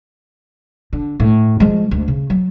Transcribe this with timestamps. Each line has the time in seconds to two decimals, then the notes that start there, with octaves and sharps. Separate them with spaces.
0.93 D3
1.20 A2
1.60 F3 G#3
1.91 D2
2.08 C#3
2.30 F#3